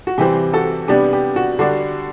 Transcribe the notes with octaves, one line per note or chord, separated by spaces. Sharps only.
F#4
C3 E3 G3 C4 G4
F#4 A4
C3 G3 B3 D4 G4
G4
F#4
D3 G3 D4 F#4